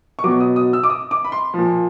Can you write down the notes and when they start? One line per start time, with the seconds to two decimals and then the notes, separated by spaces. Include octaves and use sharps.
0.19 C#6
0.24 B2 F#3 D6
0.40 D#6
0.56 D#6
0.73 E6
0.83 D6
0.90 D#6
1.11 D6
1.24 B5
1.32 C6
1.54 A#2 F3